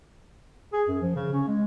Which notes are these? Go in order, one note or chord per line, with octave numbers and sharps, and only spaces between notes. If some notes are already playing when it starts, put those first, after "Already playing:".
G#4
F#2
F3
C#3
C#4
G#3